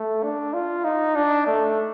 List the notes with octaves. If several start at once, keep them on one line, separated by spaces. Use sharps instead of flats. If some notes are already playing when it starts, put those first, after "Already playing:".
Already playing: A3
D4
F4
D#4
D4
A3